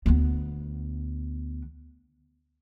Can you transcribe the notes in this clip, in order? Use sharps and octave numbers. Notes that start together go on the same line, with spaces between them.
D2 B3